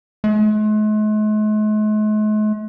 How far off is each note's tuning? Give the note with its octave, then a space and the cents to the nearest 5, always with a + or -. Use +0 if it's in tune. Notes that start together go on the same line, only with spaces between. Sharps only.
G#3 +45